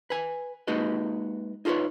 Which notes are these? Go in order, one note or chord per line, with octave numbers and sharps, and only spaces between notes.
B4 G#5
G#3 A#3 D#4 F#4 B4 D#5
D#4 F4 A4 B4 C#5